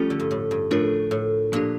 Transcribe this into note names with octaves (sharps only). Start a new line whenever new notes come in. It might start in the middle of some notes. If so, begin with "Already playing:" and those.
Already playing: F3 G3 A3 C#4 F4 A4
D3
G2
A2
G2
A2 F3 A3 D4 F4 A#4
A2
A#2 F3 A#3 D4 G4